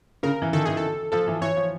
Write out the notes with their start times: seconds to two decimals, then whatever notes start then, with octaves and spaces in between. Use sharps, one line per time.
0.23 C#3 A#4
0.42 E3
0.53 D#3 A4
0.65 E3 G#4
0.77 A4
1.12 F3 A4
1.28 E3
1.42 E3 C#5
1.57 F3